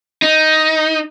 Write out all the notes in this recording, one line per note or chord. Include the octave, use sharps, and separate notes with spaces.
D#4